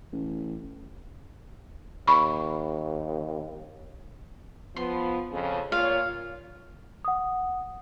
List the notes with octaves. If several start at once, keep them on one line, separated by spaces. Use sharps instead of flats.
A1
D#2 B5 C#6
F3 B3 C6
F2 C#3 F3
A#2 F4 C#5 F5
F#5 D#6